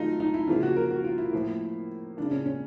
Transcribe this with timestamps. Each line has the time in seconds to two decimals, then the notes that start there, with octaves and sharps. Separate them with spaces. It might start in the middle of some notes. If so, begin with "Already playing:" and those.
Already playing: D#3 F#3 A3 D#4 F4
0.20 D#4
0.34 E4
0.47 C#3 F3 A#3 F4
0.63 F#4
0.76 A#4
0.90 F#4
1.04 F4
1.18 E4
1.33 A2 F3 A#3
2.17 C#3 F3 A#3 D4
2.31 C#4
2.45 C#4